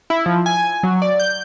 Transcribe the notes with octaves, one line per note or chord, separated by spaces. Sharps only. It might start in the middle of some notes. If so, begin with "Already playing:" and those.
E4
F3
G#5
F#3
D5
G6